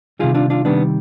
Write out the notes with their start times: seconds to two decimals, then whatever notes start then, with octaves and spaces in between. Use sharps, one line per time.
0.19 C3 D#3 G3 F4 G#4
0.35 D4 F4
0.50 D4 F4
0.65 C3 D#3 G3 B3 D4